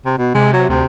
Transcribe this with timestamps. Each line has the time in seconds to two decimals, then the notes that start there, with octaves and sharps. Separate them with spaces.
0.06 C3
0.18 B2
0.34 C3 G#3
0.53 F#3
0.69 D2 C3